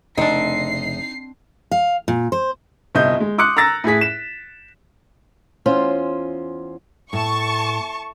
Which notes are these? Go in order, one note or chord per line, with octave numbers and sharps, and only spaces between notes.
F1 C#3 A3 C4 D4 D#4 C7
F5
A#2
C5
G1 C2 D#5 G6
G#3
C6 D6 D#6 F#6 C#7
A#5 E6 A6 A#6
A2 E4 G#4 B6
E7
E2 C#4 F4 C5
A2 A5 C#6